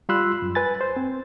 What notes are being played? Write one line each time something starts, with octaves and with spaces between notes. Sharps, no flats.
G3 F4 B5 C6 E6 F#6
F#2
B4 G#5 A6
C5
C4